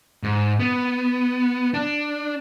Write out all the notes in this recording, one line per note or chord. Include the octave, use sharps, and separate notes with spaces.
G#2
B3
D4